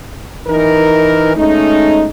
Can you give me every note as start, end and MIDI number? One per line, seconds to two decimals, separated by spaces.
0.47 1.33 52
0.47 1.33 63
0.47 1.33 70
1.35 2.06 56
1.35 2.06 57
1.35 2.06 61
1.35 2.06 63